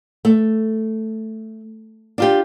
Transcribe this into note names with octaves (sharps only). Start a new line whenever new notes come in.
A3
D4 F4 G4